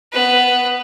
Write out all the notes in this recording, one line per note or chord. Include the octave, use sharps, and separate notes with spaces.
B3 B4